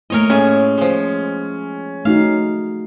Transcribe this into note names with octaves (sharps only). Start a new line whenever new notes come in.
A3 A#3 E4 A#4 C#5 D#5
A2 G#3 C#4 C#5 G#5
F3 G#3
A3 D#4 F#4 F5